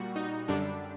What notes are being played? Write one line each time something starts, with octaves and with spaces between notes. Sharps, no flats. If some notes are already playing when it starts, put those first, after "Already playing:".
Already playing: A#2 G3 F#4
D#4
F#2 D3 G3 D4